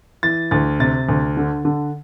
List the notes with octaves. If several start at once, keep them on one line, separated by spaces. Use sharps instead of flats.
E3 A6
D2 A6
C3 A6
D2
D3
D3